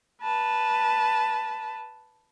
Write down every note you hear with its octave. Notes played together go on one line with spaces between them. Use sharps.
B4 A5